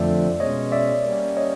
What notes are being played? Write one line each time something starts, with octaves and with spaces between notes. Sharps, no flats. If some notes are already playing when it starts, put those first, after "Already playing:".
Already playing: F2 D3 F3 A3 C4 D5 E5
B2 G#3 C#4 C#5 D#5
D5 E5
G3 A#3 C#4
C#5 D#5